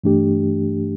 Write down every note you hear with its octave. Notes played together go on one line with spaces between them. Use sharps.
G2 E3 A3 D4 G4